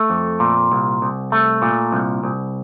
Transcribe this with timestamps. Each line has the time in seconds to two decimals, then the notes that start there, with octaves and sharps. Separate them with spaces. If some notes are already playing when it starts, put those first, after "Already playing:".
Already playing: A3
0.10 F2
0.40 A#2
0.72 C2
1.02 C2
1.32 A3
1.62 A#2
1.92 C2
2.24 C2